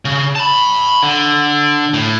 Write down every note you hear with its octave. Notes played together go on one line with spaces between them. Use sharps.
C#3
A5 B5
D3
A2